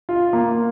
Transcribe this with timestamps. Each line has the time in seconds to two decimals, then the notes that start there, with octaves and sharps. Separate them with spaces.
0.09 F4
0.33 A#3